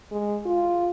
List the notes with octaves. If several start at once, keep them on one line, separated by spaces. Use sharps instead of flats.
G#3
F4